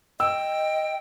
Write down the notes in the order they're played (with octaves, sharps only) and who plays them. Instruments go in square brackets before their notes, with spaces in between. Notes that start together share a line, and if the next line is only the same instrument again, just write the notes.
[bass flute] D#5 [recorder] G5 [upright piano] E6